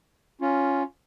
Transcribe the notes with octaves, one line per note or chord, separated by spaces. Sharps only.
C#4 F4